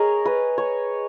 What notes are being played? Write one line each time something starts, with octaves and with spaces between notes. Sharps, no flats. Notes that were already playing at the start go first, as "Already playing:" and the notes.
Already playing: G#4 A#4 C#5 D#5
B4
C#5